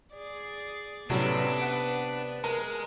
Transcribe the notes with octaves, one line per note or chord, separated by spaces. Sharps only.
G#4 D5
A2 C3 F#3 B3 C#4 D4 B4
F#5
G#3 A#4